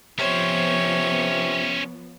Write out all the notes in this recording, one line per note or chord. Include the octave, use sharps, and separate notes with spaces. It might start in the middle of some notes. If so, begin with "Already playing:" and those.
C3 F3 B3 C#4 C5 C#5